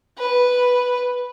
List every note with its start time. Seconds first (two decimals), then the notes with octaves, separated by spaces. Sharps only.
0.18 B4